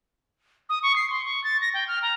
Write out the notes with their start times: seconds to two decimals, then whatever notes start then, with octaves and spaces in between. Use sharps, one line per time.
0.69 D#6
0.83 C#6
0.96 C7
1.10 C6
1.25 C#6
1.44 A6
1.61 A#6
1.74 G5
1.88 F6
2.02 A#5